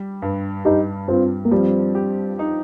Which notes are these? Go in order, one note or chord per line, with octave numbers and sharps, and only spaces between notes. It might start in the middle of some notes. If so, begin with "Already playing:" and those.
Already playing: G3
G2
G2 D#4 G4
G2 C4 F4
A#3
F3 G3 C4
G4
D#4